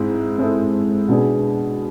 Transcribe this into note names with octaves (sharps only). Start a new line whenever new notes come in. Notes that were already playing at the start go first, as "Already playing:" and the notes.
Already playing: G#2 G#3 C4 E4
G#2 G#3 C4 E4 A4
B2 B3 D4 G#4